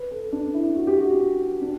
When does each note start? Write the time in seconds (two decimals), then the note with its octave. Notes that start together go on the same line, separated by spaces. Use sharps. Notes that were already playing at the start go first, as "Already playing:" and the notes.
Already playing: B4
0.11 A4
0.32 D4
0.54 E4
0.76 F#4
0.87 G4
0.98 F#4
1.62 D4